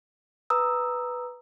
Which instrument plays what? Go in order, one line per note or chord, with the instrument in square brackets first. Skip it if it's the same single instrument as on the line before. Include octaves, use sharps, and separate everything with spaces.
[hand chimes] B4 A#5 D#6 E6